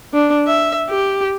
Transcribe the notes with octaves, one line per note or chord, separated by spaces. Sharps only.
D4
E5
G4